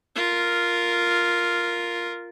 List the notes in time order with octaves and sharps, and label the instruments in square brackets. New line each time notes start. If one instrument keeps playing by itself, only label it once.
[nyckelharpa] F4 A#4